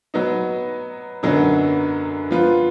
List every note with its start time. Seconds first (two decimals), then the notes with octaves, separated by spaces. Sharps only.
0.14 F#3 B3 D#4
1.23 F#2 D3 F#3 B3 D#4
2.31 F3 B3 F4 B4